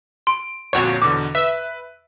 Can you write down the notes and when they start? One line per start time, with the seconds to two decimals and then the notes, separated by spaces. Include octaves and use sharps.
0.27 C6 D7
0.73 G1 F2 A#2 F#4 C#5
1.02 E2 B2 D3 D6
1.35 B4 E5